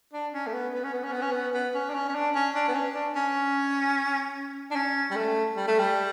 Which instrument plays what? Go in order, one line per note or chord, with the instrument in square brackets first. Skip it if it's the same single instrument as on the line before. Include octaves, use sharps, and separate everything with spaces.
[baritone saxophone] D4
C#4
A3
B3
B3
C#4
B3
C#4
B3
C#4
B3
B3
C#4
D4
C#4
C#4
D4
C#4
D4
B3
C#4
D4
C#4
D4
C#4
G3
A3
G3
A3
G3